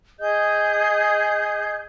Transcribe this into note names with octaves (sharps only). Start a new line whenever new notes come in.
G#4 D#5 G6